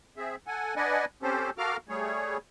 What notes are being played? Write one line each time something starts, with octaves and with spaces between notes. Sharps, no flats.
C4 G#4 E5
A4 F#5 G#5
D4 B4 D5 D#5 F#5 G#5
C4 C#4 G4 A4 C5
F#4 A4 A#4 F5 D6 F6
G3 A3 G#4 C#5